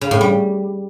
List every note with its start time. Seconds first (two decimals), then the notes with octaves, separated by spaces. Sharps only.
0.01 C#3
0.11 A2
0.21 G3